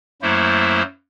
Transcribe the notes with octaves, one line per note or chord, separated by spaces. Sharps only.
F#2 F#3 A3 A#3 E4 C5